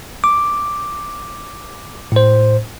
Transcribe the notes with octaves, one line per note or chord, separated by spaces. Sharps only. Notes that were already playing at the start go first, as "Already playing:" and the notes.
D6
A2 C5